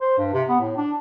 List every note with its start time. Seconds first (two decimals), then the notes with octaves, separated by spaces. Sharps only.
0.01 C5
0.18 G2
0.34 C3
0.49 B3
0.60 A2
0.77 D4